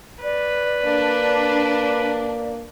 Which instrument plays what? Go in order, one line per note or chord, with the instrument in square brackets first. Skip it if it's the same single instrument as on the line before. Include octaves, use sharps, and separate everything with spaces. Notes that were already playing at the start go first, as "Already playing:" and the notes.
[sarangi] B4 [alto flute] D5
[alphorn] A#3 [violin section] D4